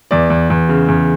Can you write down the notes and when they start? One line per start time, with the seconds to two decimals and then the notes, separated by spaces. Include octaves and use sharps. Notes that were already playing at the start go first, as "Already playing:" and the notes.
0.11 E2 D5
0.30 E2
0.50 E2
0.69 C#3
0.88 E2